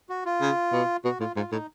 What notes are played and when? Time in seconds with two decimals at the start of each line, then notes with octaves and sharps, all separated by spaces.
0.09 F#4
0.25 F4
0.41 C#3
0.72 B2
1.04 B2 F#4
1.20 A2 F4
1.36 G#2 F4
1.52 A2 D#4